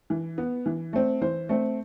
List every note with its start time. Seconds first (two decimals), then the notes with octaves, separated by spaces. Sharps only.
0.10 E3
0.38 B3
0.66 E3
0.93 A3 C4
1.21 E3 C5
1.49 A3 C4